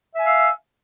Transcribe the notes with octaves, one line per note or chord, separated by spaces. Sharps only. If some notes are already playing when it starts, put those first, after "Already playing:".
E5 F5 G#5 E6